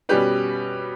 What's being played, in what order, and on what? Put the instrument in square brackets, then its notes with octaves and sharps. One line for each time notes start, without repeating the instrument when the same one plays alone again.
[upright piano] B2 G3 C#4 G4 B4